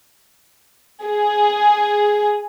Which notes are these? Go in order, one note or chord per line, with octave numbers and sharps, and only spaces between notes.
G#4